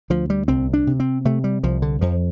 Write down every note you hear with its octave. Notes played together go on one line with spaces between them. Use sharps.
D2 F3
G3
C2 C4
D4
C3
C4
C3 A3
G3
C2 F3
D3
F2 F3